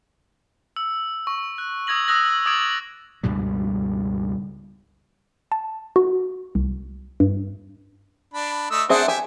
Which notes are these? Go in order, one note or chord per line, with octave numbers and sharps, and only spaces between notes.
E6
C#6
F#6
D#6 E6 G#6 A#6 F#7
D#6 E6 F#6 A#6
D6 D#6 G#6 A6 D7 F#7
C#2 G2 B2 G3
A5
F#4
C2
G2
D4 B5
A3 D#5 E6
C4 D4 G#4 C5 E5 F#5
G4 E5 G#5